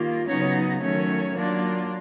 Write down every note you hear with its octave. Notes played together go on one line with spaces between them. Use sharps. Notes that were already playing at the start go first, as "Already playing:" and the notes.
Already playing: D#3 G3 A#3 F4
C#3 F#3 B3 C#4 D#4 C#5
D#3 F#3 A3 C#4 C#5
F#3 A#3 D4 F4